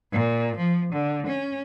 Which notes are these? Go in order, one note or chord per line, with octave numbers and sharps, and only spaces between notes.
A#2
F3
D3
C#4